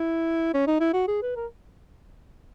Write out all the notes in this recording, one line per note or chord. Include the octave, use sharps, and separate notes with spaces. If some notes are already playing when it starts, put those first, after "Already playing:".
Already playing: E4
C#4
D#4
E4
F#4
G#4
B4
A#4